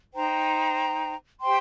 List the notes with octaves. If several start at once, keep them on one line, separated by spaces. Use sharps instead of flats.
D#4 C5 G5 A#5
G4 C5 G5 C6